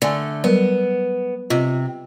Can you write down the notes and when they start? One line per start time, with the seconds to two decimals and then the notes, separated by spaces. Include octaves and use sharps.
0.02 D3 A3 D5 G#5
0.44 F#3 G3 B3 A#4
1.50 C3 F4 D#5